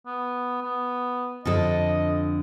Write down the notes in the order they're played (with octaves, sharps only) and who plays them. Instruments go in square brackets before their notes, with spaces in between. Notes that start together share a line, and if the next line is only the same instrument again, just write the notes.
[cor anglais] B3
B3
[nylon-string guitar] F2 D3 A4 [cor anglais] D#5